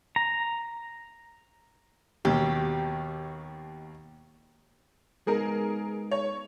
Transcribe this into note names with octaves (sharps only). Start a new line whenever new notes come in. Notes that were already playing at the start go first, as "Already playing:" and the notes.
A#5
D#2 B2 G4
G#3 B3 D#4 G#4 A#4
C#5